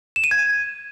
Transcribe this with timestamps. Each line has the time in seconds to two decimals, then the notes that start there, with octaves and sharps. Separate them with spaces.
0.16 E7
0.24 D#7
0.31 G#6